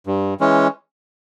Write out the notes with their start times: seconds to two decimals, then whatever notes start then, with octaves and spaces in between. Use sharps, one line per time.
0.07 G2
0.40 E3 G#3 C#4